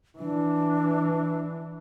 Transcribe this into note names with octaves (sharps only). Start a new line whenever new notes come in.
E3 D4